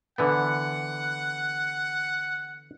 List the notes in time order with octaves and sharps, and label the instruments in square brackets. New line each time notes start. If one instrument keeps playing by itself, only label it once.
[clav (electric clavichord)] D3 E3 B3 [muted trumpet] F#5